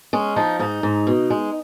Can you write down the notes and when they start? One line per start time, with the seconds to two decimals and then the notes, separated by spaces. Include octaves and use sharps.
0.13 G#3 C#4
0.36 F3 D#4
0.59 G#2 D#4
0.83 G#2
1.07 B2
1.30 G#3